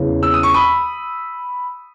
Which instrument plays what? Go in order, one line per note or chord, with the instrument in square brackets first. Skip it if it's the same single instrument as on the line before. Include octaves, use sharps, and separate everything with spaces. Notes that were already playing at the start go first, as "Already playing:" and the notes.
Already playing: [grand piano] E2 C#3 E3
E6
D#6
C#6
B5 D#6